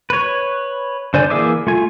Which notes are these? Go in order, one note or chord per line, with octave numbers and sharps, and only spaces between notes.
B4 C#5
D3 C5 D5 G#5
E3 A#3 G#4 E5 D6
A3 F4 G#5